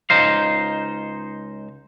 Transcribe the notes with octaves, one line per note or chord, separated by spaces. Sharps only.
C#2 D#4 C5 F5